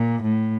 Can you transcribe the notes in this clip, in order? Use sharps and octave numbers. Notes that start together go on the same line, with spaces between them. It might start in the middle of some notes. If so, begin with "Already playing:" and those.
Already playing: A#2
A2